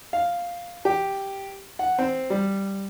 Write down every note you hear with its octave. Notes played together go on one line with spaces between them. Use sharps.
F5
G4
F#5
C4
G3